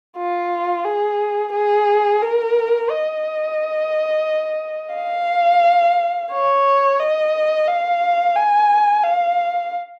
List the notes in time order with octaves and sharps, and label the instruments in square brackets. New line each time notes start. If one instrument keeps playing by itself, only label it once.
[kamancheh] F4
G#4
G#4
A#4
D#5
F5
C#5
D#5
F5
G#5
F5